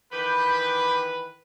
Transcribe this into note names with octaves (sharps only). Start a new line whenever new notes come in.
D#3 E3 B4 B5 D6 G6